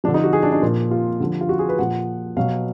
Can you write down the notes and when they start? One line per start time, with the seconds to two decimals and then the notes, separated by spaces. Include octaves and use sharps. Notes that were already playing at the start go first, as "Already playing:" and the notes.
0.04 F3 D4
0.08 D3
0.14 D#4
0.24 F#4
0.33 G#4
0.43 D4
0.52 D#4
0.62 A#2 F3
0.91 F4
1.20 D3 F3
1.41 F4
1.49 F#4
1.59 G#4
1.69 B4
1.78 A#2 F3 F#5
2.37 B2 F#3 F5